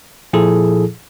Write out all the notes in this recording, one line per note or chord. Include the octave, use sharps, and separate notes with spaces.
A#2 F3 E4 G#4 A4